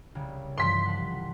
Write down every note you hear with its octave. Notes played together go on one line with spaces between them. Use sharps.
C2 C#3
G2 E3 F3 C6 B6
F#5 A5